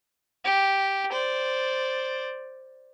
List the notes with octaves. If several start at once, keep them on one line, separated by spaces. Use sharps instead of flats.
G4
C5 D5